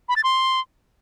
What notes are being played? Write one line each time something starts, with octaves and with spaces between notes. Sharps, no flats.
B5
A6
C6